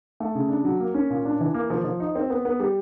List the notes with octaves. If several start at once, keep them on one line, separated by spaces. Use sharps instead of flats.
A3
C#3
D4
F#3
A#3
C#4
A#2
D4
E3
A#3
F3
F3
D#4
C4
B3
B3
G3